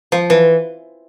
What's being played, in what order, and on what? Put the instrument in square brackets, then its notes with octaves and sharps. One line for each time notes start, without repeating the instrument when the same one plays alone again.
[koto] F3
E3